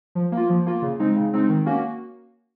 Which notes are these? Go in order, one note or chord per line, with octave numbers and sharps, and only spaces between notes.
F3
A#3
F4
F3
A#3 F4
C#3
G#3 C4 D#4
C#3
G#3 C4 D#4
D#3
A#3 C#4 F#4